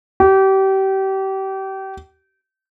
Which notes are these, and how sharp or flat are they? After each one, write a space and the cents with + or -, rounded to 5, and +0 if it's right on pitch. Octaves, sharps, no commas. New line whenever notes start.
G4 -30